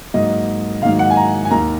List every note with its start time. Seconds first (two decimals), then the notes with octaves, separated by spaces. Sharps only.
0.14 G#2 F#3 A#3 D#5
0.82 G#2 D#3 F#3 A#3 F5
0.99 F#5
1.10 G#5
1.17 A#5
1.45 G#5
1.50 D#2 D#3 A#3 A#5